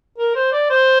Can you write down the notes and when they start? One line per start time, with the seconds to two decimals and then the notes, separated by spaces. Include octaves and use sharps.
0.18 A#4
0.35 C5
0.52 D5
0.70 C5